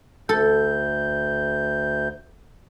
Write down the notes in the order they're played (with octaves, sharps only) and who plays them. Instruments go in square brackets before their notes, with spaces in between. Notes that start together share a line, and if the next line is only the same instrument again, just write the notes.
[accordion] D2 G6 [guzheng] A4